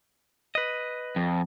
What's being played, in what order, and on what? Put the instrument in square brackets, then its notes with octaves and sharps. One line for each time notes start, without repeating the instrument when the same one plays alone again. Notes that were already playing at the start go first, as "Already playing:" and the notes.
[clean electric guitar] B4 D#5
[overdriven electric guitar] F2